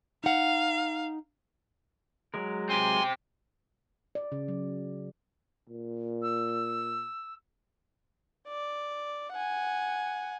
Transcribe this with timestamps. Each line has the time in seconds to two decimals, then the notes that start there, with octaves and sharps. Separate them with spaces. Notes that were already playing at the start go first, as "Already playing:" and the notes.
0.24 D#4 F5 F#5
2.34 F#3 G#3 A#4
2.69 C4 G4 G#5 C6
4.15 D5
4.32 C#3
4.48 F#3
5.68 A#2
6.22 E6
8.48 D5
9.32 F#5 G#5